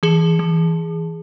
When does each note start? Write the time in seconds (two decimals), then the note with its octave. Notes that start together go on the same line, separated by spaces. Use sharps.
0.03 E3 G#4
0.39 E3